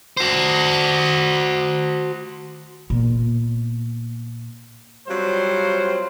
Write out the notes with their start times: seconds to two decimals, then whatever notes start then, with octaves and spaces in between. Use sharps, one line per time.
0.17 F#4 C5
2.90 A#2 B3
5.08 F#3 G3 C4 F4 C5